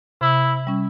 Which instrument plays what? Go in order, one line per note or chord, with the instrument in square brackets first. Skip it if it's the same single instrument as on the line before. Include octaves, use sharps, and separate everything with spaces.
[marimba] C3 [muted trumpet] E4
[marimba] G3 C#4